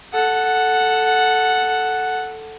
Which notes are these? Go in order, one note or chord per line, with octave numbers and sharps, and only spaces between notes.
A4 F#5